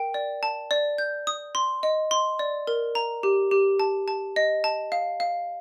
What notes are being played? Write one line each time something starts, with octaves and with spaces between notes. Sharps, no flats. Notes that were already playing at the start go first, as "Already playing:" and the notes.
Already playing: A#4 G5
D5
A5
D5
G6
D#6
C6
D#5
C6
D5
A#4
A#5
G4
G4
A5
A5
D#5
A5
F5
F5